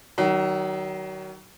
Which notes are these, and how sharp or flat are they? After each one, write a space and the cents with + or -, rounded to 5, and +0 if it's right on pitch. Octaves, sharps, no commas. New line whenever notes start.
D#3 +0 F#3 +35